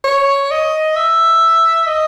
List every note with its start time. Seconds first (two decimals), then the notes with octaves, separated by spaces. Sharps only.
0.04 C#5
0.51 D#5
0.96 E5
1.87 D#5